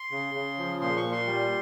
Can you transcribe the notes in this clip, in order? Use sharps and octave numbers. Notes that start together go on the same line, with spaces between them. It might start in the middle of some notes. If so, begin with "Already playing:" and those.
Already playing: C6
C#3
C#3
F3
A#2 C6
C#6
A#2
C6
G3